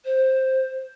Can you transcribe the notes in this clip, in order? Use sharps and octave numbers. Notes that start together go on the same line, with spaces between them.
C5